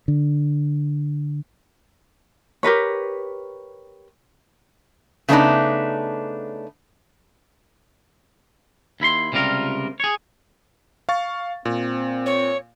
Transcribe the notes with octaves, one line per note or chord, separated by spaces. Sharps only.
D3
G4 A#4 B4 C#5
C#3 A3 B3 D4 D#4
D#2 E4 B5 C6
C#2 C3 G3 F4 A#4
G#4 C#5
F5 C#6 A6
A#2 C4
C#5